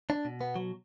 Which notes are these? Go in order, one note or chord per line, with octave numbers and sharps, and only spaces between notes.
D4
B2
B3
F#3